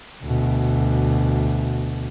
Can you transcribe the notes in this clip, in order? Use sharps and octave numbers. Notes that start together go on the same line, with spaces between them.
D2 B2